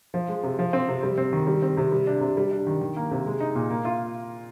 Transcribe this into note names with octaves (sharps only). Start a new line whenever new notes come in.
F3
G#3
C3
F3
C4
C3
G3
C4
D#3
G3
C4
C3
G3
D4
C3
G3
D4
D#3
D#3
A#3
C3
G#3
D#4
A#2
A#3
F4